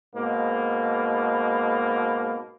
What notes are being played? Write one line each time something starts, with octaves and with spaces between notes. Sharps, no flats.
G#2 B2 A#3